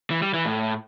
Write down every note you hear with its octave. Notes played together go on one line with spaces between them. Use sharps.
E3
G3
E3
A2